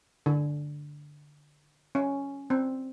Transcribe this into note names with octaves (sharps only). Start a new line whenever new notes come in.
D3
C#4
C4